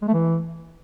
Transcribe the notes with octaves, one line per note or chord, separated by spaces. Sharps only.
G#3
A3
E3